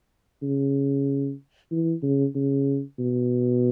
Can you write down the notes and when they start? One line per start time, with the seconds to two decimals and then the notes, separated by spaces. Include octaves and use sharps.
0.42 C#3
1.71 E3
2.03 C#3
2.35 C#3
2.99 B2